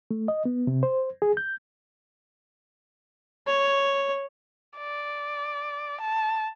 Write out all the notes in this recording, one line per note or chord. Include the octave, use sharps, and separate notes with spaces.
A3
D#5
B3
C3
C5
G#4
G6
C#5
D5
A5